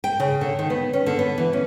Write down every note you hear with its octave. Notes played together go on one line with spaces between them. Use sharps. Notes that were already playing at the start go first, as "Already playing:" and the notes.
G5
C#3
D3
D#3
B3
C#4
D3
B3
E3
C#4